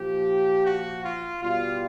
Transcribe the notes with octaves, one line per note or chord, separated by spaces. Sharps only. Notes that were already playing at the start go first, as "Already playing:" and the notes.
Already playing: A#2 F3 G4
F#4
F4
B2 G3 F4